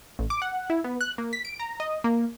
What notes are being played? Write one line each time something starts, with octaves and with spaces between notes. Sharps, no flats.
A1
D6
F#5
E4
B3
F#6
A#3
B6
D7
A#5
D#5
A#3